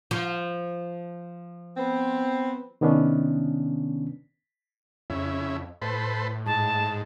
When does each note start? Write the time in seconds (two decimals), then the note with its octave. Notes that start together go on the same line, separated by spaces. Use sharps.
0.11 F3
1.77 B3 C4
2.81 C3 D#3 B3 C#4 D4
5.10 F2 C#3 E4
5.82 A2 A4 B4 C5
6.46 G#2 A5